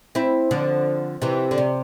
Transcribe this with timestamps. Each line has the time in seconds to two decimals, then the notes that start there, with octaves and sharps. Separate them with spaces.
0.15 C4 E4
0.51 D3 F3
1.22 C3 E3
1.51 D3
1.58 C3